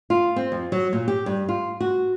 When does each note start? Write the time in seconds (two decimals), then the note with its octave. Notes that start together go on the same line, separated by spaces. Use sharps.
0.10 F4
0.36 C4
0.52 F2
0.72 F#3
0.93 A#2
1.08 G4
1.26 G2
1.49 F4
1.80 F#4